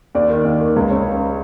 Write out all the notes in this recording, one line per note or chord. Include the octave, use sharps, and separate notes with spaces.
D#2 D5
D#3
D#2
D#3
C#2
C#3 C#5